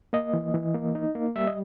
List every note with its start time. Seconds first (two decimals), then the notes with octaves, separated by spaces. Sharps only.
0.13 A#3 D#5
0.33 E3
0.54 E3
0.74 A#3
0.95 D#4
1.15 A#3
1.36 G3 E5
1.47 D#5